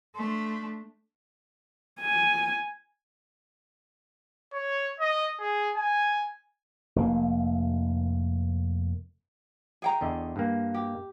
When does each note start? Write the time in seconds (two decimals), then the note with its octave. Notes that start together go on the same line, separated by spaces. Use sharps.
0.16 A3 D4 C6
2.01 G#5
4.53 C#5
5.00 D#5
5.39 G#4
5.76 G#5
6.96 F1 A#3
9.82 G#4 G5 A#5
10.01 E2 D3 D#5
10.36 G2 A#3
10.74 G4